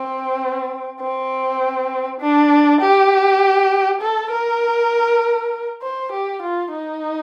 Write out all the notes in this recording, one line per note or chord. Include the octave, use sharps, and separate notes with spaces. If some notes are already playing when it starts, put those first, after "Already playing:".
Already playing: C4
C4
D4
G4
A4
A#4
C5
G4
F4
D#4